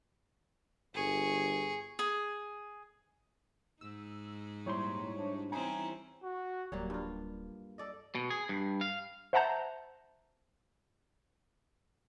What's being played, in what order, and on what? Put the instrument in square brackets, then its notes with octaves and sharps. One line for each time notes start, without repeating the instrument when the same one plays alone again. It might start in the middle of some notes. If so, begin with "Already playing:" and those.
[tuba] G1 [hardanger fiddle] G#4 C#6
[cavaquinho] G#4
[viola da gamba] G#2 D#4 [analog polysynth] E6
[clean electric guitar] F2 A#2 C6 [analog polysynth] G3 E4 C5 [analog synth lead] C#5
[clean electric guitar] D4
[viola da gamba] E3 C4 C#4 [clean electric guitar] D#4 [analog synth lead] G#5
[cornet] F#4
[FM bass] D1 [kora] F#3 G3 A#3
[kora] G2 F4
A4 D5 D#5
[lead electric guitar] B2
G#4
G2
F5
[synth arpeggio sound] C5 E5 F#5 A5 A#5 G6